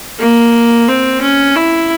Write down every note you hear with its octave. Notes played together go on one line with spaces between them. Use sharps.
A#3
C4
C#4
E4